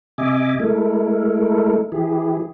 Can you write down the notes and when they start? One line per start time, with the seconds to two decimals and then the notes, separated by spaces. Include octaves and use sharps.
0.18 C3 D#5 E5 G#5 D6
0.60 G#3 A3 E4 A4 A#4
1.92 E3 E4 G4 G#4